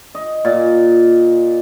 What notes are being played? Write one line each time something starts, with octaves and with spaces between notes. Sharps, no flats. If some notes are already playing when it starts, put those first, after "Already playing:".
D#5
A#2